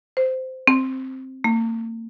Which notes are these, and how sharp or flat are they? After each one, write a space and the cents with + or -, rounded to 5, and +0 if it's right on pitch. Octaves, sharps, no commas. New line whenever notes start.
C5 -10
C4 +5
A#3 -45